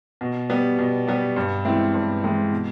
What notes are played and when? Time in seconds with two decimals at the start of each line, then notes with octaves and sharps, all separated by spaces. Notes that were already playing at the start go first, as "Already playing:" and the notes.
0.21 B2
0.50 G3 B3
0.78 B2
1.07 G3 B3
1.36 G2
1.65 E3 G#3 C4 E4
1.94 G2
2.22 E3 G#3 C4 E4
2.52 B2